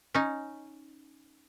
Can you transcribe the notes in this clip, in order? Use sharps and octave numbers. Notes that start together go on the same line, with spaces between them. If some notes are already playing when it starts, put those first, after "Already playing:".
C#4 D#4